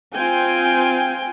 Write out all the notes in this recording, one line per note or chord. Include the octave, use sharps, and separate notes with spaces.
C4 F4 G5 G#5